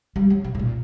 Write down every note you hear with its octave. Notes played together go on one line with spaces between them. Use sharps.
G3
F#3
C3
A2
A#2